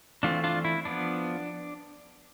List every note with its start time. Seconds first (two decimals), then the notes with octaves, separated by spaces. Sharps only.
0.23 E3 A3 C4 D4 F4
0.44 D4 F4
0.65 E4
0.85 F3 B3 D4